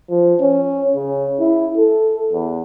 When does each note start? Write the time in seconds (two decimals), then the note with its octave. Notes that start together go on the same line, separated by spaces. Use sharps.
0.10 F3
0.41 C#4
0.95 C#3
1.40 E4
1.77 A4
2.32 E2